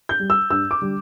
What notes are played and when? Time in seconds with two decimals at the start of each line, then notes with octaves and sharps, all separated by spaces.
0.09 G6
0.20 G3
0.30 E6
0.50 G2 E6
0.71 D6
0.81 D3 G3